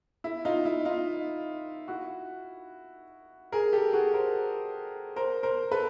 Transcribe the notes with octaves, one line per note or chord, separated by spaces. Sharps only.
E4
D#4 F4
E4
D#4 F4
E4 F#4
G#4 A#4
G4 A4
F#4 G#4
A#4 C5
A#4 C5
A#4 C5
A4 B4